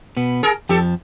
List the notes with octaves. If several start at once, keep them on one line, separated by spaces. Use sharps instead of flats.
B2 B3
G#4 A#4
F2 F3 G4 A4